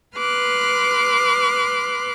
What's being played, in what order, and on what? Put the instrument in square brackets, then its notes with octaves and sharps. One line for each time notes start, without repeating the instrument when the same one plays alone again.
[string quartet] B4 C6 D6 F6 F#6